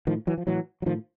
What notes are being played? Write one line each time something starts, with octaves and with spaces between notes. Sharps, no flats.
A2 D#3 F3
E3 F#3
F3
A2 E3 F#3
F#3
A2 D#3 F3